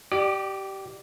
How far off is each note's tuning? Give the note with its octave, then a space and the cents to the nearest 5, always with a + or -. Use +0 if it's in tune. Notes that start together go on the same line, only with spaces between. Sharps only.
G4 -20 D5 +25